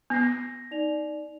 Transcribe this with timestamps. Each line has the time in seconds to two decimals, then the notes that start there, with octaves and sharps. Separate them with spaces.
0.10 B3 G6 A#6 C7
0.71 D#4 D5 F7